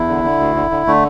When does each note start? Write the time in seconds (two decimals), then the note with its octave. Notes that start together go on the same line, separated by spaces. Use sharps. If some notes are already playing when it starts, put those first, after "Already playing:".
Already playing: E2 E4
0.08 D3
0.24 D3
0.40 D2
0.56 D3
0.71 D3
0.87 D3 A3